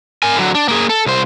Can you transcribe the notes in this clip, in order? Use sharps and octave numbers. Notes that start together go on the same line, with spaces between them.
A#4 G#5
D3 F#3
D4
A#3 G#4
A4
C2 C5